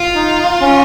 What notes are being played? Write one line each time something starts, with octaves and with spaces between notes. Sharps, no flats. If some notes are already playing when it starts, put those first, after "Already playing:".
Already playing: F4
D#4
C#4